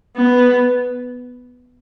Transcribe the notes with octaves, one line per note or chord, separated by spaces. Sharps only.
B3